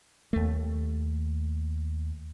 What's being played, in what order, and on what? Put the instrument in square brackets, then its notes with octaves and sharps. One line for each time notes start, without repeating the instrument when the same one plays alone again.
[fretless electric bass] D#2 A3